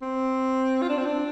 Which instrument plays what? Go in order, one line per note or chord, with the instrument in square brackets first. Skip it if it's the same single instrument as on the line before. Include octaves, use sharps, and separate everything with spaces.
[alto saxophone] C4
F4
D4
C4
D4